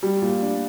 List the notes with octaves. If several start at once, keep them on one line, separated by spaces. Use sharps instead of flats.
G3
A#2
D4